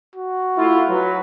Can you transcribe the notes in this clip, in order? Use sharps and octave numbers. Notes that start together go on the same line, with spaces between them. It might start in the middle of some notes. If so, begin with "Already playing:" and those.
F#4
A3 E4 F4
F#3 B4